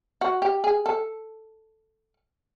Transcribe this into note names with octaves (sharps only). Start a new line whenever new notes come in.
F#4
G4
G#4
A4